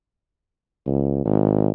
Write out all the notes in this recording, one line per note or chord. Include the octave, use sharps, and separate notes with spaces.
C#2
G#1